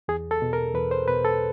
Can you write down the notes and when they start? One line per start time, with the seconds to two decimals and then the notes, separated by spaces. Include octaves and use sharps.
0.08 E2 G#4
0.31 A4
0.42 B2
0.53 A#4
0.74 E2 B4
0.91 C5
1.08 B2 B4
1.25 A4